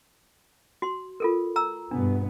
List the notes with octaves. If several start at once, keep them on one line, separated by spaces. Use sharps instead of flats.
F#4 C6
F4 A4 A#4
A#5 E6
G2 B2 B3 D4